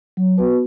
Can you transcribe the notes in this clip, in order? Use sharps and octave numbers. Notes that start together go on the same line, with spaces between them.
F#3
B3 F#4 B4